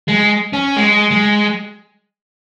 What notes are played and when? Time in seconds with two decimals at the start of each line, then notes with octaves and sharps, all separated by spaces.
0.08 G#3
0.53 C#4
0.76 G#3
1.11 G#3